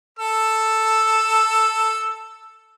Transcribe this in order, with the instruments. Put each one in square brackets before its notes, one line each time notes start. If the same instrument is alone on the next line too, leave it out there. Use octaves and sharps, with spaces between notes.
[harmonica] A4 E6